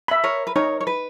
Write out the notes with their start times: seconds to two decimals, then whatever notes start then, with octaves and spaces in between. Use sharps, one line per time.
0.08 E5 B5
0.24 A#4 C#5
0.47 B4
0.55 D#4 A#4 C#5
0.81 C#5
0.87 B4